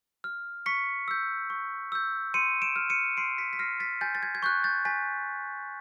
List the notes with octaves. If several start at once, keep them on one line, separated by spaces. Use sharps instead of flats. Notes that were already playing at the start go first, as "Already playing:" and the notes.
F6
C#6 B6 C#7
E6 G6
C#6
E6 G6
C6 C#7 D#7
D7 E7
F6
C#7 D#7
C6 C7 D7
B6 C#7
B6
F6 A#6 C7
A6 B6
G#5 G6 A6
A6
G#6
G#6
C#6 F#6 G6
G6 A6
G#5 A6 B6